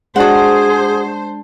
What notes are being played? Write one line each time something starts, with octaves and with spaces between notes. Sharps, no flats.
G#3 D4 F#4 G#4 C5 F#5 A5